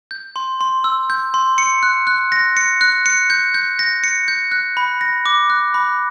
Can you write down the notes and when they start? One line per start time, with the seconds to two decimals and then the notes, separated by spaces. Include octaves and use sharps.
0.11 G6
0.36 C6
0.61 C6
0.84 E6
1.10 G6
1.34 C6
1.58 C#7
1.83 F#6
2.07 F#6
2.32 A#6
2.57 C#7
2.81 F#6
3.06 C#7
3.30 G6
3.54 G6
3.79 A#6
4.04 C#7
4.28 G6
4.52 F#6
4.77 B5
5.01 A#6
5.26 D6
5.50 F#6
5.74 B5